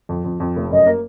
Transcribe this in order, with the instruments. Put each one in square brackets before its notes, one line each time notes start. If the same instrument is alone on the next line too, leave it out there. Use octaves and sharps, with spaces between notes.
[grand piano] F2
F2
F2
F1
[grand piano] F#2 [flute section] D#5
[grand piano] A#3